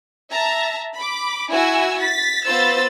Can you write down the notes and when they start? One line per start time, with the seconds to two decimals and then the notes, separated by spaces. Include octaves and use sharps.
0.31 E5 A5 A#5
0.97 B5 D6
1.50 E4 F#4 G#5 E6
2.00 A6 B6
2.46 B3 F4 C5 B5 E6 A6